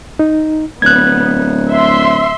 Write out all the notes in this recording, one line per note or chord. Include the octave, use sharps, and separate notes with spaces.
D#4
D1 B3 F#6 G#6
E5 C6